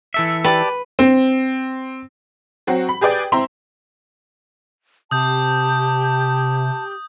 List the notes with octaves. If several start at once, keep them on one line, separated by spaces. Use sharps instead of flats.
E3 A4 E5
G4 B4 D5 A5
C4
F#3 C4 F#4
B5
G4 G#4 B4 D5 G5
C4 E4 A#5 C6
C3 G4 A5 D#6 G6